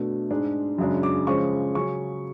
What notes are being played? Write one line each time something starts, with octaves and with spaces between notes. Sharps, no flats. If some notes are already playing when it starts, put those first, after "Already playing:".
Already playing: B2 A3 D4
G#2 G#3 D4
F#2 C#3 G#3 D4
D6
C#3 F3 G#3 C#4 C#6
C#3 F#3 C#4 C#6